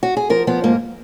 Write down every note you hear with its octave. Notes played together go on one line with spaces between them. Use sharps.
F#4
G#4
F3 A#4
F3 B3
G#2 A#3